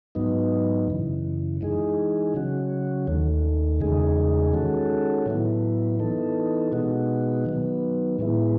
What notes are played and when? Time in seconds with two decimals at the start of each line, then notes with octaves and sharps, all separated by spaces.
0.15 G#2 F#3 B3 D#4
0.88 F#2 C#3 E3
1.61 E3 G#3 D#4 G#4
2.34 C#3 F#3 C#4 F#4
3.07 D#2 D#3 A3
3.80 E2 C#3 G#3 D#4 G#4
4.53 D#3 G#3 C#4 F#4 A4
5.26 A2 F#3 B3 E4
5.99 E3 B3 D#4 A4
6.72 B2 G#3 B3 D#4 F#4
7.45 D#3 F#3 B3
8.19 A2 G#3 B3 E4